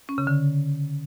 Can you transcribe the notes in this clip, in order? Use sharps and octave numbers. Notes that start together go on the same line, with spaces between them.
C#4
C#3
D3